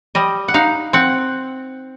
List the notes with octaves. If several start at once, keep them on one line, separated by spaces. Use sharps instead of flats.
G3 D#5
F#5
D#4 F5
C4 F#5